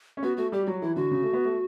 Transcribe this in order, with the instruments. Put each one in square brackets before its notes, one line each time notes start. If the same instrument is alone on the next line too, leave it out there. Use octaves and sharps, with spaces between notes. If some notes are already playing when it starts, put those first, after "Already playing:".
[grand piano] C#4
[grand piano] B3 [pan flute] F#4
[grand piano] A3 [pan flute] F#4
[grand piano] G3 [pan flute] G4
[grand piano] F#3 [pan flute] F#4
[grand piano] E3 [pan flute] E4
[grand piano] D3 [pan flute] F#4
[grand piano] C#3
A3
B3
A3